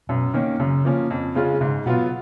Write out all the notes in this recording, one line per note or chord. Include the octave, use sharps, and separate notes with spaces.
F#2 B2
D#3 A#3 C#4
F#2 C#3
F3 A#3 C#4
F2
C#3 G#3 C#4 F4
G#2 C#3
B2 F#3 B3 F4